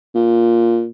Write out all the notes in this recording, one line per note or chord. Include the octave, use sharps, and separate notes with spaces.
A#2